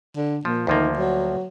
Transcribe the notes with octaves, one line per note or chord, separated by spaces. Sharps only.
D3
A#2 F3
D2 D#3 F3 A#3
F#3